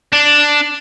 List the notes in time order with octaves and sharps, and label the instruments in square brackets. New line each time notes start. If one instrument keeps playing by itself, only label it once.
[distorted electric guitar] D4